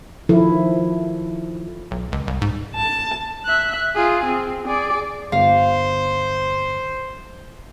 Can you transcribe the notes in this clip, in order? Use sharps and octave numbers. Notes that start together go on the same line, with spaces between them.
D#3 F3 E4 A4
B1
C#2
C2
G#2
A5
E5 F#6
F4 G#4
C4
G#4 D5
G1 C5 F5